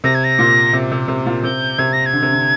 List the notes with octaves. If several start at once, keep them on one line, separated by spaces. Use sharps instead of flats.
C3 A#6
G#6
A#6
A#2
C3
C3
C3
A#2
C3 G6
C3 G#6
A#6
G#6
D3
C3
D3